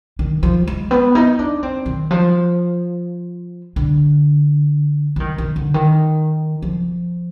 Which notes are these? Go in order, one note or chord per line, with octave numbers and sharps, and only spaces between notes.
D#3
F3
G#3
B3
D#4
D4
C4
D#3
F3
D3
F3
D#3
D#3
D3
D#3
F3